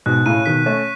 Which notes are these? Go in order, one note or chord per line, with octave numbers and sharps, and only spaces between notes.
G#2 B2 F#6
A2 C#3 D#7
B2 D#3 B6
A3 C#4 C#6